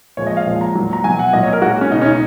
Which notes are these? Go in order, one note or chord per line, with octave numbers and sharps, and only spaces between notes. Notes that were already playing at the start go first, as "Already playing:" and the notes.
A#2 F3 G#3 C#5
D#5
F5
A#2 F3 G#3
A#5
A#2 F#3
A#5
B2 F#3 G#5
F#5
A#2 F#3 D#5
C#5
A#4
A#2 G#3 F#4
C#4
B2 G#3 D#4
C#4
D#4